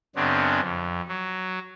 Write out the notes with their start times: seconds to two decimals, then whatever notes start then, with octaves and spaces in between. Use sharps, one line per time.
0.16 F#2 C#3 B3 C4 D4
0.62 F2
1.08 F#3